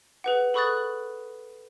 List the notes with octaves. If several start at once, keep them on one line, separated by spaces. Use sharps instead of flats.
G#4 B4 F#5
A4 B5 C#6 D#6 F#6 A6